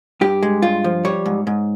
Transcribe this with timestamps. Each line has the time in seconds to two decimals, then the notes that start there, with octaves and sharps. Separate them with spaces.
0.21 G2 G4
0.43 G#3
0.62 G2 F4
0.84 F3
1.05 G3 C#5
1.26 G#2
1.47 G#2